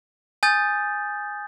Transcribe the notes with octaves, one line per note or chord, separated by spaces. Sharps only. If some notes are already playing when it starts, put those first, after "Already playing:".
G#5 D#6 G6 A6